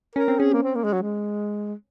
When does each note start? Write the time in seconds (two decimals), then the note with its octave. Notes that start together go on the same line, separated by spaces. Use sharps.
0.15 C#4 A#4
0.28 C4
0.39 C#4 G#4
0.53 A#3
0.63 C4
0.75 A#3
0.84 G#3
0.93 F#3
1.02 G#3